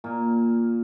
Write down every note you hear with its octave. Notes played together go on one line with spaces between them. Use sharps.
A#2 A#3